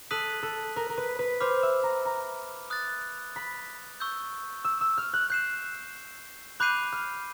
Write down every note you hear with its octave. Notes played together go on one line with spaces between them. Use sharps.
A4 D#6 F#6 B6 D#7 F#7
A4
A#4
A#4
B4
B4
C5 B5 D6 F6
E5
A#5
A#5
D#6 F#6 A6
B5
C#6 E6 G6
E6
E6
F6
F#6
F#6 G6 C7 E7
B5 D6 F#6 G6 C7 D#7
F6